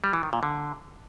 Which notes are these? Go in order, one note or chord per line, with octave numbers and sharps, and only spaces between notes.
G3
E3
D#3
A#2
D3